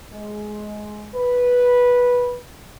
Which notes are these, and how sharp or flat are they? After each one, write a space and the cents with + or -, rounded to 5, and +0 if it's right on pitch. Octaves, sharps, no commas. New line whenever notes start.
G#3 +15
B4 -10